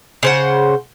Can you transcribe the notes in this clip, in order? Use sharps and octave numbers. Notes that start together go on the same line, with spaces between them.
C#3 C5 F#5